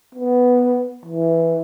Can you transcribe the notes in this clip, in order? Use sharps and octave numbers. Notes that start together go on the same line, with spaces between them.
B3
E3